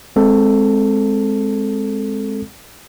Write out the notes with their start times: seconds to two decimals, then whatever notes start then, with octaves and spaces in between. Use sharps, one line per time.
0.16 G#3 C4 A4